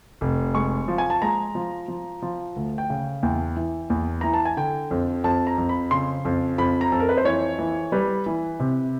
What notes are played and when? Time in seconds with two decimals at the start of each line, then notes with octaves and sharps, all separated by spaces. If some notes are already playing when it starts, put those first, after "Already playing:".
0.21 F1
0.54 G#3 C#6
0.88 F3
0.98 G#5
1.10 A5
1.22 G#3 A#5
1.55 F3
1.88 F3
2.22 F3
2.56 D2
2.78 G5
2.90 C#3
3.23 E2 G5
3.57 E3
3.90 E2
4.21 E3 A#5
4.34 A5
4.45 G#5
4.57 D3 G5
4.91 F2
5.24 F2 A5
5.47 A#5
5.58 F2
5.69 B5
5.91 C#3 C6
6.25 F2
6.58 F2 B5
6.81 A#5
6.92 F2 A4
7.00 A#4
7.09 B4
7.17 C5
7.25 E3 C#5
7.59 E3
7.92 G3 B4
8.26 E3
8.60 C3